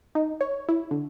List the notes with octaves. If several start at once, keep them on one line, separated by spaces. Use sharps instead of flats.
D#4
C#5
E4
D3